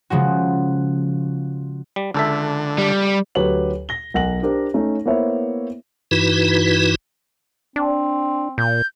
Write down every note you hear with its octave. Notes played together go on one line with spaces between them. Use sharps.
C#3 F3 G#3 F#4
G3
C#2 D3 A4 E5
G3
D2 F#3 G4 B4 C#5 F#7
A#6 G7
B1 A#4 F#5 A#6 F#7
D4 G4 A#4 C5
A3 C#4 D#4
A#3 B3 E4 C5 C#5 E5
G2 E3 D#4 E4 F#4 B4
C4 D4
A#2 G6